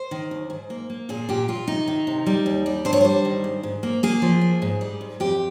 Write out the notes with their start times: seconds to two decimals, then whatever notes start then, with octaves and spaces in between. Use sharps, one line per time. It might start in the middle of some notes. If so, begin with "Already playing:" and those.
Already playing: C5
0.11 D#3
0.31 D#2
0.50 G#2
0.70 A#3
0.90 A#3
1.09 A#2 G#4
1.29 A#2 G4
1.48 A#2 F4
1.68 C3 D#4
1.88 D#3
2.07 C3
2.26 G3
2.46 D#2
2.66 G3
2.85 G2 C5
2.93 C#5
3.01 G3 C5
3.25 D#3
3.44 G#2
3.63 G#2
3.83 A#3
4.03 A#3 G#4
4.22 F3
4.41 A#3
4.62 G#2
4.81 G3
5.01 G#2
5.20 F2 G4